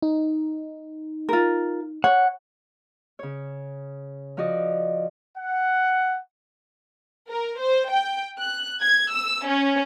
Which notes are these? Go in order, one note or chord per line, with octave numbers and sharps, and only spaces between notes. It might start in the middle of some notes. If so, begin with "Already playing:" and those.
D#4
F4 A#4
C#5 F#5
C#3 C#5
F3 F#4 D5 D#5
F#5
A#4
C5
G5
F#6
G#6
E6
C#4